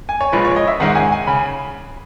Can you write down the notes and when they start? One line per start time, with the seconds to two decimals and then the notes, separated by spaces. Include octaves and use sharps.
0.09 G#5
0.21 C#5
0.32 A#1 A#2 G#3 B4
0.45 C#5
0.56 D#5
0.68 E5
0.80 G#2 D#3 G#3 C#4 F#5
0.95 G#5
1.12 G#5
1.27 C#3 B5